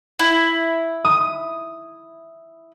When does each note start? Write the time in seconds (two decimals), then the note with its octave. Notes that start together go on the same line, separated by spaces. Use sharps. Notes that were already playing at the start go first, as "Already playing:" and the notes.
0.19 E4
1.05 D#6